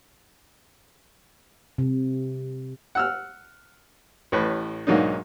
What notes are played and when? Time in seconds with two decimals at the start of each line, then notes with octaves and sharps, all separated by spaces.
1.78 C3
2.95 F#5 E6 F6
4.32 A1 A2 B4
4.87 B1 G#2 F#3 A#3 D4 D#4